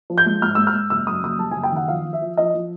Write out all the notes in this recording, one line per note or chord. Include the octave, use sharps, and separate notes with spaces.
F3
G6
G#3
G#2 F6
G#2 E6
F6
G#2
F#1 E6
F#2 D#6
F#1 D#6
G3 A5
G#5
F#1
G5
D#3 F#5
F3 F5
F3
E5
F3
F3 D#5
F3